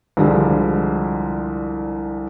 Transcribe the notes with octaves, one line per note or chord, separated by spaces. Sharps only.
C2 D3 F3 G3 G#3